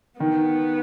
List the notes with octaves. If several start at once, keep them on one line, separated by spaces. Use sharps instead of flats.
D#3 B3